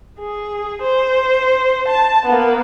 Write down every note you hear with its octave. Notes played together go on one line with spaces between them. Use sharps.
G#4
C5
A5
A#3 B3